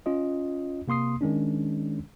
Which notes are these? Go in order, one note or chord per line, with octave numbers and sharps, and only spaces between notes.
C#4 F4 D#5
C3 A#3 C6 D#6 C7
D#3 G#3 C#4 D4